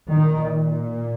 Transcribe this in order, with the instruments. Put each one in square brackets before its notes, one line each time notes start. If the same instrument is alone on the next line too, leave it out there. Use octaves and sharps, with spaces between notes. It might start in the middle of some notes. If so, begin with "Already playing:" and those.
[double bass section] A#2 D#3